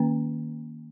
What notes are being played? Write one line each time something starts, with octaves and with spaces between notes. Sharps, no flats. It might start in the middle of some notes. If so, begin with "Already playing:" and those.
Already playing: D#3 A#3 C#4